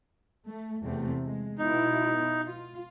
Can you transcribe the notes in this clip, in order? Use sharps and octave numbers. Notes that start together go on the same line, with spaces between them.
A3
E2 C3 A3
G#3
B2 D#4 E4
F4